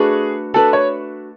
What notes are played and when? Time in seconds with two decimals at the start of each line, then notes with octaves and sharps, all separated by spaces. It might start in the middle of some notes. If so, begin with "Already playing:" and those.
Already playing: A3 D4 F#4 G#4 B4
0.54 A3 D4 F#4 A4 B4
0.73 C#5